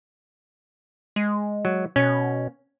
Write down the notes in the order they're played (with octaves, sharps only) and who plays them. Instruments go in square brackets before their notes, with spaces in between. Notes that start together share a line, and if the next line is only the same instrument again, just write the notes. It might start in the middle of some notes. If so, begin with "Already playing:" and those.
[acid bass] G#3
[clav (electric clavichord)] F#3
[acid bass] B2 [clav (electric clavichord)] C#4